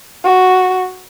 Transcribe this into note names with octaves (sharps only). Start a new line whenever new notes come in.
F#4